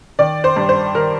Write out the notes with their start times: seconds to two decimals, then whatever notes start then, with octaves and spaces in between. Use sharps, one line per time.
0.19 D#3 D5
0.44 C5
0.56 G2
0.69 C5
0.94 D#3 A#4